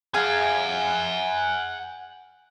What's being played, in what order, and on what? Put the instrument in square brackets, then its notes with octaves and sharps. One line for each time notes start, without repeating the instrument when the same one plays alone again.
[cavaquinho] G#4 F5 [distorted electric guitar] F#5 G#5